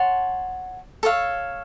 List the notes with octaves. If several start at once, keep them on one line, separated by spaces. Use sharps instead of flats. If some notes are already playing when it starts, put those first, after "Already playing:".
Already playing: C#5 F#5 A5 C6
A4 C#5 F5